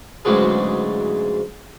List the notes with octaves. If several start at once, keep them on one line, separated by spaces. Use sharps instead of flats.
D2 G#2 C#3 E3 F#3 G#4